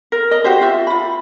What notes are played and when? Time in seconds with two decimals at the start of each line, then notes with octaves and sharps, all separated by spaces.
0.12 A#4
0.31 D#5
0.44 F#4 G4 C5
0.61 F4 E5
0.87 F4 B5